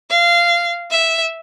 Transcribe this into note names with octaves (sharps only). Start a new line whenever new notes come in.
F5
E5